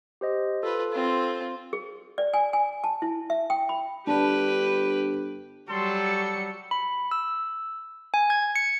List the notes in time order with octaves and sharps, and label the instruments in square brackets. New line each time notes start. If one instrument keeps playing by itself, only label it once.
[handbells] G4 C5 D#5
[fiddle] F4 B4 [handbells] A4
[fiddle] C4 F4
[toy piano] G#4
D5
G#5
G#5
A5
E4
E5
G5
B5
[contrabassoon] G1 [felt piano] D4 [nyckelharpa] G4 [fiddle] B4
[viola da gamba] F#3 G3 [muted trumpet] A4 [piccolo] C6
[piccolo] C#7
[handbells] B5
E6
G#5
G#6
C#7